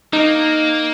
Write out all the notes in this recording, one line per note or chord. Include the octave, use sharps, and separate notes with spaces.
A#3 D#4